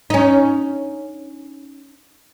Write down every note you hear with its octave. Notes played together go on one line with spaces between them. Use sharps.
C#4 D#4